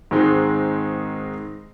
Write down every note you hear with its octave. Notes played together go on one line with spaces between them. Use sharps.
G#2 D#3 G#3 C4 D#4